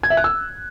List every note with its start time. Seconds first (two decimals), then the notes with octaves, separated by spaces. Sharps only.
0.03 G#6
0.10 E5
0.17 F#6
0.24 E6